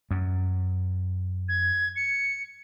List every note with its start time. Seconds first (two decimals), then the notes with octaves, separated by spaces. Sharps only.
0.11 F#2
1.48 G#6
1.96 C#7